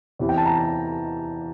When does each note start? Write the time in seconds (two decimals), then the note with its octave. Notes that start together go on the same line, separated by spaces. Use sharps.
0.19 E2 C3 E3
0.29 G5
0.37 A5
0.46 A#5